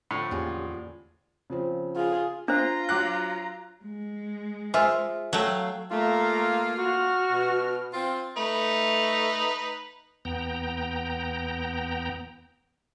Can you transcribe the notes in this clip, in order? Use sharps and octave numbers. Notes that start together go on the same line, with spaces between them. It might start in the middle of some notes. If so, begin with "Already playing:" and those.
A2 D3 F3 C#6 C#7
E2 A#3 C#4 F4 G4 G#4
C#3 F3 C4
F4 G#4
D4 F4 C5 A#5
F#3 D6 F#6
G#3
F4 G#4 C5 E5
F#3 A3 F5 G5
A3 A#3 F4 A#5
F#4 F6
B2
C4 F4
A3 D#4 B4
E2 B3 G5 A#5